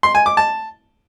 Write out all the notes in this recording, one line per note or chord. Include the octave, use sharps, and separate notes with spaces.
C6
G#5
D6
A5